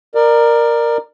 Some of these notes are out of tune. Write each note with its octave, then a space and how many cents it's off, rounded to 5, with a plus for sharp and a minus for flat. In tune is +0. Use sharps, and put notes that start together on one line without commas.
A#4 +0 D5 +25